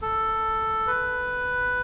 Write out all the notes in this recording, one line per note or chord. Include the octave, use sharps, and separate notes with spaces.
A4
B4